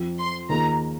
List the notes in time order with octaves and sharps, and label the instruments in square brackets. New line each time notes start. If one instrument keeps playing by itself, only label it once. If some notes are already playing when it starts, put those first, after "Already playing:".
Already playing: [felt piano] F2 F3 C4
[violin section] C6
[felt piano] D#2 D#3 A#3 F4 G#4 [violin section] A#5